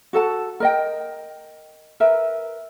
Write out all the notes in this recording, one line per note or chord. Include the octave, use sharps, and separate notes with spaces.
F#4 A4 F#5 A5
A#4 D#5 G5
A#4 B4 E5